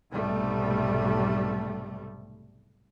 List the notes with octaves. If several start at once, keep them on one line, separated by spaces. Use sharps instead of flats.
B1 G#2 C3 G3 A3